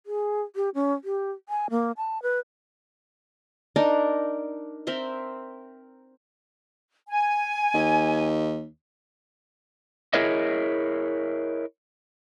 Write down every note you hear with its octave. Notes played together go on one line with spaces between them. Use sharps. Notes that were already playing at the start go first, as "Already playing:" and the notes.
G#4
G4
C#4
G4
G#5
A#3
A5
B4
D4 D#4 A#4 D5
C4 A#4 E5 C6
G#5
D#2
E4 G#4 A#4 C#5 D#5 E5